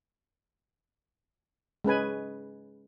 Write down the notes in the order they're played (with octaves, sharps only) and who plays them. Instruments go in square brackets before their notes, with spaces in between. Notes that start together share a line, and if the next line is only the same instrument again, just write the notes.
[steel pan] G#3 C#4 B4 G#5